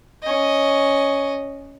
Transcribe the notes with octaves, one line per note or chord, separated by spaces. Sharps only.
C#4 D#5